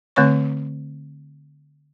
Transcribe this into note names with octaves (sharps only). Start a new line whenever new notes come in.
D3 A3 C4 C#5 C#6